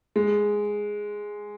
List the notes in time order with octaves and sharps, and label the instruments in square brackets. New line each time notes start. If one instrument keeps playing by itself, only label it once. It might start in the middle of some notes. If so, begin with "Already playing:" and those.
[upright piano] G#3